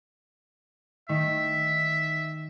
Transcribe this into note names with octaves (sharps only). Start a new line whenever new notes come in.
D#3 A3 D#4 E5